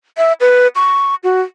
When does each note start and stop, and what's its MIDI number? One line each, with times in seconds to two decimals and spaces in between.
0.17 0.33 76
0.40 0.68 71
0.76 1.15 85
1.24 1.41 66